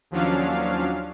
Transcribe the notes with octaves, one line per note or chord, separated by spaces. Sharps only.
D#2 F3 F#3 C#4 D4 F5